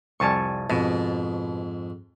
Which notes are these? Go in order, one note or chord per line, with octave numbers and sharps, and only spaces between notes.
C2 F2 G3 G#5 A5 C#6
F2 G#2 B2